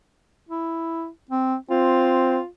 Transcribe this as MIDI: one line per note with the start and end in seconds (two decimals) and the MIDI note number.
0.49 1.09 64
1.31 1.56 60
1.70 2.41 60
1.70 2.48 65